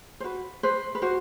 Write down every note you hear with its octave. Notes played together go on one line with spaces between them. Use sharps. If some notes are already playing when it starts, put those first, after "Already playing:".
C5
F#4 B4
B4 C5
B4
F#4 C5